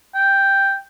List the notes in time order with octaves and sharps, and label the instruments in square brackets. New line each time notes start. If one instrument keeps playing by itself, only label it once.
[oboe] G5